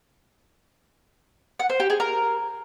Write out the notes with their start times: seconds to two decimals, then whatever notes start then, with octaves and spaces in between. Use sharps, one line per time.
1.60 F#5
1.70 C5
1.80 G4
1.90 G#4
2.00 A#4